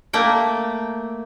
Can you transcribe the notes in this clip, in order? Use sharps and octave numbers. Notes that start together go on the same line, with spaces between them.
A3 A#3 G5